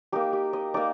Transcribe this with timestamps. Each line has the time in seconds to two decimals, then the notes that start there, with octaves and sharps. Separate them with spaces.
0.12 A#3 D#4 G4
0.33 G4
0.53 D#5
0.74 A#3 D#4 D5